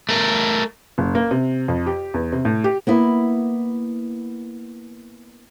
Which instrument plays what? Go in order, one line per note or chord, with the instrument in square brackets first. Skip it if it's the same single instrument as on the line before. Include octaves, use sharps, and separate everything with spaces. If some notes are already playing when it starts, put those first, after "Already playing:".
[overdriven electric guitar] A3 A#4
[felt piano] F#1
A#3
C3
F2
G4
E2
C3
A2
G4
[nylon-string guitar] A#3 B3 E4